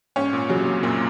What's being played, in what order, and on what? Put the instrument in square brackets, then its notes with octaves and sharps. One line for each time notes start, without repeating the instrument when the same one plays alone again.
[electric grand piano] G#2 [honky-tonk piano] C#4
[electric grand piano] A#2
[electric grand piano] C#3 [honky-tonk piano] F#3
[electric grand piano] C3
A#2
[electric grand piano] F#2 [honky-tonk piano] A#2